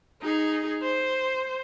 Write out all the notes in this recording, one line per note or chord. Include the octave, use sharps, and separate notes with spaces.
D#4 G#4
C5